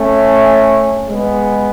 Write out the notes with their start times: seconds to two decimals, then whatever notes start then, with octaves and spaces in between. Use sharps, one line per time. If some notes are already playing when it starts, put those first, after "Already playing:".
Already playing: A3 C#4
1.10 G#3 B3